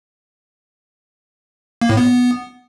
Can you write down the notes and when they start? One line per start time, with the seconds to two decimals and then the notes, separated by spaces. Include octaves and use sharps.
1.81 A#3
1.89 A2
1.97 B3